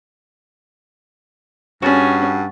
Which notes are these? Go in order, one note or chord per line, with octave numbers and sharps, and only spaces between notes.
G2 C#4 F#4 G#4 F#5 A6 B6